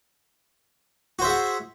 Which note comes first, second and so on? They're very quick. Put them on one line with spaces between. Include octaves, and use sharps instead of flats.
F#4 C5 E5 G#4 F#5